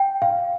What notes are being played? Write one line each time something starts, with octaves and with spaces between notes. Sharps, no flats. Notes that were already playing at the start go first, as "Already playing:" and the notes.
Already playing: G5
F5